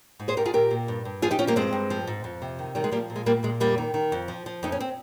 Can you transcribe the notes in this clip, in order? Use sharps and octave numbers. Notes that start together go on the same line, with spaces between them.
G#2
G#4 C5
G#2 G4 A#4
F4 G#4
A#2 G4 A#4
A#2
G2
G2
F3 F4 G#4
D#4 G4
F3 C#4 F4
G3 A#3
G2 G#3 C4
G2
F3
G#2
F2
C3
D#3
D#3 G3
G#3
F3 G3 A#3
A#2
G#3
A#2 G3 A#3
A#2 G#3
F2 G3 A#3
D#3
D#3
F2
F3
F3
F2 D#4
C#4
C4